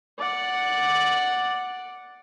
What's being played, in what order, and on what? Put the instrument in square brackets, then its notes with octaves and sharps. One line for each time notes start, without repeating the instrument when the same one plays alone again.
[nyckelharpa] D5 F#5